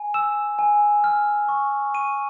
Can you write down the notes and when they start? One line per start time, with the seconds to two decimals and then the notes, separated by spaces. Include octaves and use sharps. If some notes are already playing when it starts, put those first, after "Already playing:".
Already playing: G#5
0.14 E6 E7
0.59 G#5
1.04 F6
1.49 C#6
1.94 C#6 D#7